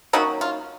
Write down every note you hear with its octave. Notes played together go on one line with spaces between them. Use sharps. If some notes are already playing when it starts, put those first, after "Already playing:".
D#3 F#3 A#3 C#4 D#4 F#4
F4